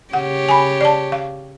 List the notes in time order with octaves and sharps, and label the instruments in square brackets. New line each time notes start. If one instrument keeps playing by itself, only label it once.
[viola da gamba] C#3 G4 C#5 [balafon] F#5
[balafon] G#5 B5
D5 A5
F5